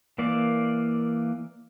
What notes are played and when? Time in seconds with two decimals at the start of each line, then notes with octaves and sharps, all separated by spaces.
0.18 E3 A#3 D5